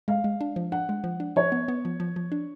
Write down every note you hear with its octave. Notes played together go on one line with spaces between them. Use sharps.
G#3 F5
G#3
D4
F3
D4 F#5
G#3
F3
D4
F3 C#5
B3
B3
F3
F3
F3
D4